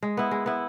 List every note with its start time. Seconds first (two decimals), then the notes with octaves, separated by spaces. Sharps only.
0.03 G#3
0.17 B3 E4
0.31 G#3
0.46 B3 E4